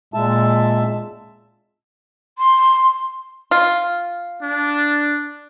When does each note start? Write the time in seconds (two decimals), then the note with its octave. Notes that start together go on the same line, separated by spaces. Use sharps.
0.14 A#2 G#3 E5 A5
2.38 C6
3.51 F4
4.42 D4